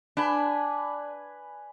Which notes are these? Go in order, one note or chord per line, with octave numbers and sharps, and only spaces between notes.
D4 B4 G#5 B5